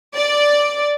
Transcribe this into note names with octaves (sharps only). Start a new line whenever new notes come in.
D5